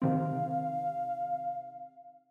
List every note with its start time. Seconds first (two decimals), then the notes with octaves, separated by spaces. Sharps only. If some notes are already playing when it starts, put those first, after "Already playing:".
0.02 C3 D#3 C4 F5